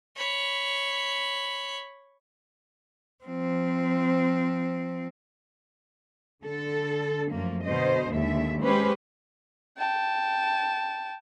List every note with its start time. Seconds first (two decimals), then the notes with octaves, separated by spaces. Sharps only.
0.16 C#5 B5
3.25 F3 C4
6.43 D3 A4
7.32 F#2 F3 A3 A#3
7.65 B2 D3 C5 D#5
8.12 D#2 D3 G#3 E5
8.63 G#3 C#4 G4 B4 C5
9.78 G5 A5